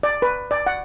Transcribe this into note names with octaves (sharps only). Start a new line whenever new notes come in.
D5
B4
D5
F#5